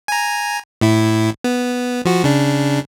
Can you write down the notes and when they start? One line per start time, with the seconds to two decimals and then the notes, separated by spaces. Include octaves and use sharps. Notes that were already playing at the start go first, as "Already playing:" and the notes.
0.08 G#5 A#5
0.81 A2 E4
1.44 B3
2.05 F3 F#4
2.24 C#3 D4